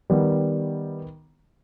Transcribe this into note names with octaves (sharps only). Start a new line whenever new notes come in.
D#3 G3 B3